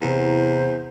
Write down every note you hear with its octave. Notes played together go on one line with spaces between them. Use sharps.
E2 C3 E4 C5 A#5